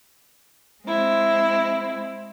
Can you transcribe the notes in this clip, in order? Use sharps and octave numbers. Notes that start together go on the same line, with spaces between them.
G#3 C4 E4